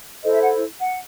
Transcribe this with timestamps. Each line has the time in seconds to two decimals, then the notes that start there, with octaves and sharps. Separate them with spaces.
0.24 E4 A4 C5 D#5
0.34 E5
0.43 F#5
0.80 F#5